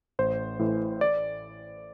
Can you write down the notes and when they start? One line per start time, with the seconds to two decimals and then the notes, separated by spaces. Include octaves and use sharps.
0.19 A1 C5
0.59 A2 E3
1.01 D5